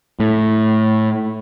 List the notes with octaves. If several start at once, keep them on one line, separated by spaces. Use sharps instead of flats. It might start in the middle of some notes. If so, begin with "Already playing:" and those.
A2